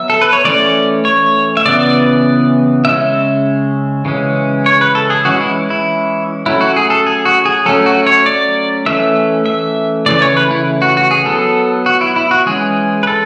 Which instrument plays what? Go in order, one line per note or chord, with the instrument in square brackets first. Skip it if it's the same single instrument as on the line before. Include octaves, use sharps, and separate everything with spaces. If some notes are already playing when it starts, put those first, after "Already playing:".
Already playing: [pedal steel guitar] F#3 B3 E5
A4
B4
C#5
E3 A3 C#4 D5
C#5
E5
C#3 E3 B3 D5
C#3 G#3 C#4 E5
C#3 E3 G#3 C#4
C#5
B4
A4
G#4
E3 G#3 C#4 F#4
E4
E4
F#3 A3 C#4 E4
F#4
G#4
A4
G#4
F#4
G#4
F#3 A3 C#4 A4
F#4
C#5
D5
E3 A3 C#4 E5
E5
C#3 E3 A3 C#4 D5
C#5
B4
E4
F#4
F#4
G#4
F#3 B3 A4
F#4
E4
E4
F#4
E3 G#3 C#4 G#4
B4
A4